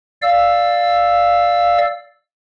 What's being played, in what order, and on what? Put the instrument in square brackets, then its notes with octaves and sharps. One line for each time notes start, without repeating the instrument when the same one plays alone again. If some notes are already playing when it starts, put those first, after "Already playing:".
[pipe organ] D5 F5 E6